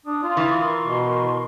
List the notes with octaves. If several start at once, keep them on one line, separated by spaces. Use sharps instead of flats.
D4 D#6
F4
E3
A#4 C6 C#6
B2